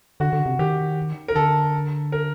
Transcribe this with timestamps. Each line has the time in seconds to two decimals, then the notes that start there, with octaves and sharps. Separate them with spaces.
0.20 D3 F#4
0.33 D3
0.46 C3
0.59 D#3 G4
1.28 A#4
1.36 D3 A4
2.12 A#4